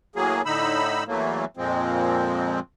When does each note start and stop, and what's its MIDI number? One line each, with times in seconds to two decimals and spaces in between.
0.16 0.42 45
0.16 0.42 54
0.16 0.42 58
0.16 0.42 68
0.45 1.04 45
0.45 1.04 50
0.45 1.04 63
0.45 1.04 83
0.45 1.04 88
1.07 1.45 40
1.07 1.45 52
1.07 1.45 54
1.07 1.45 57
1.07 1.45 58
1.57 2.60 41
1.57 2.60 46
1.57 2.60 53
1.57 2.60 56
1.57 2.60 60